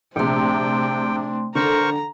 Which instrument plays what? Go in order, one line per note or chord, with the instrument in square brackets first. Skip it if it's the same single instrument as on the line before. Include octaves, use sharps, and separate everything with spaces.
[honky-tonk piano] A#1 C3 [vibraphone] A3 C6 [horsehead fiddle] C4 D4 [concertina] G5
[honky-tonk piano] D3 [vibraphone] D4 A4 [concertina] A#4 C5 C#6 [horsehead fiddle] A#5